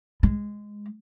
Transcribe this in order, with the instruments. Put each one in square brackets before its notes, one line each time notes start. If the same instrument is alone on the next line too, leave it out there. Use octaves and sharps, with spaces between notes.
[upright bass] G#3